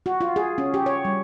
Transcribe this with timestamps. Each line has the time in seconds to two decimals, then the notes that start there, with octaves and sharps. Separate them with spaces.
0.06 F#4
0.21 F4
0.36 G#4
0.58 C#4
0.74 G4
0.86 C#5
1.05 G3